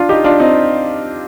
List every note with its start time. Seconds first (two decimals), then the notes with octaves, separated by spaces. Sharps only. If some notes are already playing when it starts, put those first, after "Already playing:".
Already playing: D4 F4
0.09 D#4 G4
0.24 D4 F4
0.40 C4 D#4